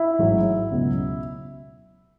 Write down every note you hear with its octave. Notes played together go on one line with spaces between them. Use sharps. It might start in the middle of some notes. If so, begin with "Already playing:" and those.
Already playing: E4
A1 G#2 F#3
C#2 B2 F#3